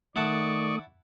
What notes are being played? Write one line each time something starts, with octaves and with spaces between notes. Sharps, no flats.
D#3 A3 E4 D5 F#5 A5 C#6 D#6